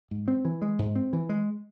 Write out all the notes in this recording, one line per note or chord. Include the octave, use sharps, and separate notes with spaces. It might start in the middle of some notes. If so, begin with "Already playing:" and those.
G#2
C4
E3
G#3
G#2
C4
E3
G#3